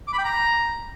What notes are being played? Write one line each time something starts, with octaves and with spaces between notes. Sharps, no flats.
D6
B5
G5
A#5